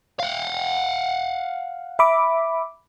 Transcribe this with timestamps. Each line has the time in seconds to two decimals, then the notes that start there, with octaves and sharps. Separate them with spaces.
0.19 F5 F#5
1.99 E5 B5 D6